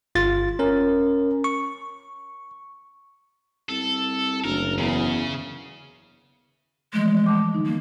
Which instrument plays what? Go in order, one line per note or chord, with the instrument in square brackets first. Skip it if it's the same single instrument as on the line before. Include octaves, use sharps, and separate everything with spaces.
[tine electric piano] G1 F4 A6
C#4 A#4
C#6
[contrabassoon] C2 [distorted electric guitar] A4
[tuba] F#1 [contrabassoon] D2 [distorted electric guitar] A#4
[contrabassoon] E2 [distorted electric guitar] C#3
[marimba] E3 F3 A3 [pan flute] G#3
[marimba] A5 D6
D3 G3 D#4
[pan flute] A#3